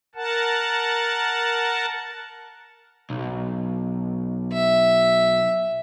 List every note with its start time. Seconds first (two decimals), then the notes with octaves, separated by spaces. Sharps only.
0.15 A#4 F#5 A5
3.10 B1
4.53 E5